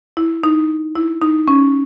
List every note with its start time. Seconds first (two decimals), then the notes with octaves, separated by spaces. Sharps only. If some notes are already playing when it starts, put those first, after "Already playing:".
0.17 E4
0.43 D#4
0.95 E4
1.21 D#4
1.48 C#4